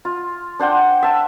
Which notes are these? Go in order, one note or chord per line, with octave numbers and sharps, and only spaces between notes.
F4
D4 C5 F#5 G5
E5 A5